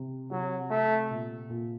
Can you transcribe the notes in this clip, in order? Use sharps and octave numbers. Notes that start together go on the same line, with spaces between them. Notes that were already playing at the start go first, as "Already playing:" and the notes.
Already playing: C3
C3 F#3
C3 A3
A#2
A#2